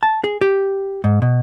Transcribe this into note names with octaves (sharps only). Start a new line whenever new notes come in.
A5
G#4
G4
G#2
B2